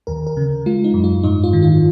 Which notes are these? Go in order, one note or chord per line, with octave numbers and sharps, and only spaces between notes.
D#2 A#4
A#4
C#3
G#3 F4
D#4
F#2
F4
G#2 D#4
F4
D#3
F4